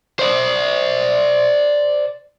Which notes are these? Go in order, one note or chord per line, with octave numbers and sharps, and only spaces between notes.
C5 D5